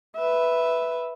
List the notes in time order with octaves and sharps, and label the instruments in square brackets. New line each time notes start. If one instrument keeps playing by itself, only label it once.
[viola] B4 E5